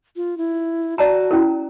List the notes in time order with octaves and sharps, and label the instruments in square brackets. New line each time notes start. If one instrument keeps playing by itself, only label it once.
[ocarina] F4
E4
[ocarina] F#4 [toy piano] D5 A5 A#5
[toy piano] C#4 E4 A#4